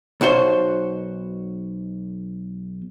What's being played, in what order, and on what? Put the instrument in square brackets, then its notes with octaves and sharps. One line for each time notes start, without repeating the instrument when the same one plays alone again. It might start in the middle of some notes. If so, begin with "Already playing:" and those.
[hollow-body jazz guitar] B1 B2 F#4 C5